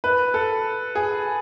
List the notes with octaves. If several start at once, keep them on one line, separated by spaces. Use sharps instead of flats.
B4
A4
G#4